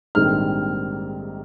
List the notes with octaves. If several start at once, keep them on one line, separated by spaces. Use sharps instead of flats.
A#1 G#2 D#3 G3 C4 F6